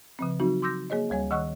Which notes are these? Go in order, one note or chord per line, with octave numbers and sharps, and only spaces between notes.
C#3 F3 C4
F#3 C4 D#4 F#4
C6 D6 E6 G6 A#6
A#3 G#4 C#5 D#5
D2 G3 C#5 G#5
D#3 D#5 F#5 C#6 E6 F#6